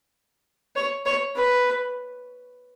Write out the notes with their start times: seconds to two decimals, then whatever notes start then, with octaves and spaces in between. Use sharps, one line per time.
0.76 C#5
1.06 C#5
1.36 B4